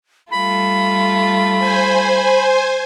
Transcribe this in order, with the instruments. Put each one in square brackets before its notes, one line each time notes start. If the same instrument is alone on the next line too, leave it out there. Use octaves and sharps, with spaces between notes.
[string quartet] G3 A3 F4 [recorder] B5
[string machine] C5 G#5